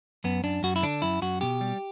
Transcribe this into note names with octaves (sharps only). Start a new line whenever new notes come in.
F#2 B3
F#2 D4
F#2 F#4
E4
D3 D4
F#2 E4
F#2 F#4
B2 G4
G3